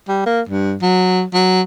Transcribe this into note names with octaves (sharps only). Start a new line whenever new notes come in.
G3
A#3
G2
F#3
F#3